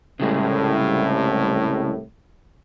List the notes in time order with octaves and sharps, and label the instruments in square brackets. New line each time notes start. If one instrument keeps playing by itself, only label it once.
[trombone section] C2 A2 [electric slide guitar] C#3 G3 G#3